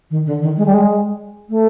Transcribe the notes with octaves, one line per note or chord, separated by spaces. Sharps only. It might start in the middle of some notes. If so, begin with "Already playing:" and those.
D#3
D3
D#3
G#3
G3
G#3
A3